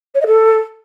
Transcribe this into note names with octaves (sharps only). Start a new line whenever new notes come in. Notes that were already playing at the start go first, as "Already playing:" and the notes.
C#5
D#5
A4